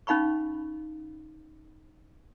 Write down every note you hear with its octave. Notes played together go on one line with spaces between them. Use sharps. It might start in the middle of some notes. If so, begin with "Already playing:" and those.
C#4 D#4 F5 B5 C#6